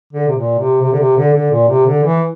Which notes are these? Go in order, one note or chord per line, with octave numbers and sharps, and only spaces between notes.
D3
C3
A#2
C3
C3
D3
C3
D3
D3
A#2
C3
D3
E3